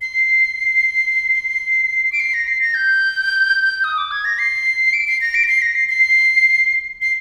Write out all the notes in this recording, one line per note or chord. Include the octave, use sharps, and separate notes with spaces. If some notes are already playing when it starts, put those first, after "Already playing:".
C7
D7
C7
A#6
C7
A#6
G6
D#6
D6
G#6
A#6
C7
D7
C7
A#6
D7
A#6
C7
A#6
C7
C7
C7